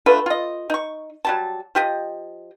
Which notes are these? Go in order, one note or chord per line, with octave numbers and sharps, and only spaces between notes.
D3 A3 F4 B4
F4 D#5
D#4 C#6
F#3 G3 A5
F3 G4 D#5